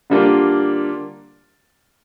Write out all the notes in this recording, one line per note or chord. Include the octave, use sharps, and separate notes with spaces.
D3 G3 A#3 D4 F4